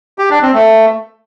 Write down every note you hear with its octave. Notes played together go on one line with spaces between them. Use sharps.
G4
D4
C4
A3